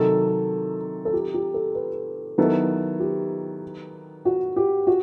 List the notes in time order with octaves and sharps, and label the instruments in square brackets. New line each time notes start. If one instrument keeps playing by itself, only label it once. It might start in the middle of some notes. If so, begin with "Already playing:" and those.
Already playing: [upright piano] C3 D#3 F#3 [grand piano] A4
[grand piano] A4
G4
G4
A4
B4
[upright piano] D#3 F#3 B3 E4 A4
[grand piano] G4
F#4
G4
F#4